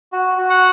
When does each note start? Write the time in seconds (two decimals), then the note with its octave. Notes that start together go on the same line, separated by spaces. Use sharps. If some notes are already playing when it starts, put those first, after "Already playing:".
0.12 F#4
0.38 F#4
0.50 F#5